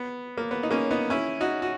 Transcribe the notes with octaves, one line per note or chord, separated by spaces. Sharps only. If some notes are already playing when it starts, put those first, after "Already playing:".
Already playing: B3
A#3
B3
D#4
A#3 C#4
B3 D#4
C#4 E4
D#4 F#4
F#4